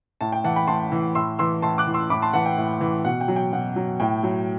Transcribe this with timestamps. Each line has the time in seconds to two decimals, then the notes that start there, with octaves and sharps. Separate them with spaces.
0.21 A2 A5
0.32 G5
0.44 E3 F#5 A5
0.56 G5 B5
0.68 A2 A5 C6
0.92 E3
1.15 A2 C6 E6
1.39 E3 C6 E6
1.62 A2 A5 C6
1.78 D6 F#6
1.87 E3
1.94 C6 E6
2.10 A2 B5 D6
2.22 A5 C6
2.33 E3 F#5 A5
2.45 G5
2.57 A2
2.81 E3
3.05 B2 F#5
3.21 G5
3.28 F#3
3.36 G5
3.52 B2 F#5
3.76 F#3
4.00 A2 G5
4.23 F#3